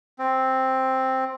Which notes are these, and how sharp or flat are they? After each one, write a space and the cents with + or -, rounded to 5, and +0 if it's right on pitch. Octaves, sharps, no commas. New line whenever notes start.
C4 +5